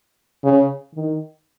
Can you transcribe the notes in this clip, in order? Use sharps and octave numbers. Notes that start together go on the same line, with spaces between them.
C#3
D#3